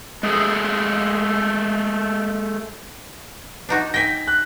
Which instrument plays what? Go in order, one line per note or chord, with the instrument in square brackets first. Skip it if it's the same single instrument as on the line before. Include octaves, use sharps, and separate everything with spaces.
[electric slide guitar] G#3 A3 G#4 A4
[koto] D4 D#4 F#4
[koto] G5 G#5 [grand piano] A#6 B6
[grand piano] F#6